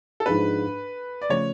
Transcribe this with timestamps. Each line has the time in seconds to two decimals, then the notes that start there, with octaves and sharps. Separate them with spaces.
0.20 A4
0.26 G#2 F3 G#3 D4 B4
1.22 D5
1.29 C#3 F3 A3 C#4 C#5